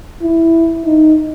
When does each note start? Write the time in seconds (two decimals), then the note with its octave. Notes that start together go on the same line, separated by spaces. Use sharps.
0.22 E4
0.86 D#4